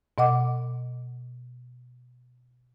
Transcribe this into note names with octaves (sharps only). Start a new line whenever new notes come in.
B2 D#5 F#5 D6